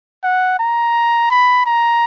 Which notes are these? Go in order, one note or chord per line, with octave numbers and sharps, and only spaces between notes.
F#5
A#5
B5
A#5